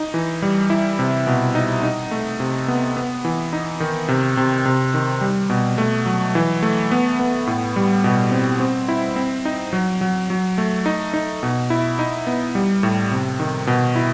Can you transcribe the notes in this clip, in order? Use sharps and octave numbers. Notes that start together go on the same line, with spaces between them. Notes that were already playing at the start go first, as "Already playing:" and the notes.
Already playing: D#4
E3
G3
E4
C3
B2
D#4
D#4
A3
C3
B3
B3
E3
D#4
D#3
C3
C3
C3
D#3
G3
B2
A3
F#3
E3
A3
B3
B3
A2
G3
B2
C4
C4
E4
C4
D#4
F#3
F#3
F#3
A3
D#4
D#4
B2
E4
D#4
B3
G3
A2
C3
D#3
B2
E4